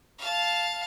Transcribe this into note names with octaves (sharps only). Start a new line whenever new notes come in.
F5 A5